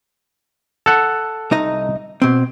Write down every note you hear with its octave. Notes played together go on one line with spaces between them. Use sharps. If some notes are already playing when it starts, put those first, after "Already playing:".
A4 F#5
C2 D#4 D#5
B2 C4